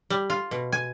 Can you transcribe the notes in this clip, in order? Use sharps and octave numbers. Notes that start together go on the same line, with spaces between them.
G3
F4
B2
G#5